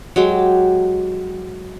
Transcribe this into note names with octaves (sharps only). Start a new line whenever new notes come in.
F#3 G#3 G4